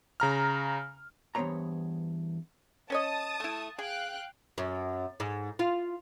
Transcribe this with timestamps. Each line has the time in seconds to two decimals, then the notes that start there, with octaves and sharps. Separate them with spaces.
0.20 C#3 A#5 F6
1.35 E2 G2 B3 C5 C#5 A#5
2.90 C#4 C#5 D#5 A5 D#6
3.40 A3 E4
3.78 G#4 F5 G5 F#6
4.58 F#2
5.20 G#2
5.59 F4